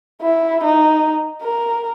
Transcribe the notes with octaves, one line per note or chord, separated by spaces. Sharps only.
E4
D#4
A#4